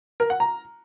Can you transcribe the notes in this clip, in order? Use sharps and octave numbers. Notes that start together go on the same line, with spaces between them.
A#4
F#5
A#5